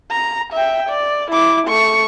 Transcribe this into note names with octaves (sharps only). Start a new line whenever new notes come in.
A#5
E5 G5
D5
E4 D6
A3 C#6